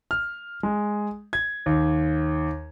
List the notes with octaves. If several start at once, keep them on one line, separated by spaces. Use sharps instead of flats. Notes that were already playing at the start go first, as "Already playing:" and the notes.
F6
G#3
G#6
D#2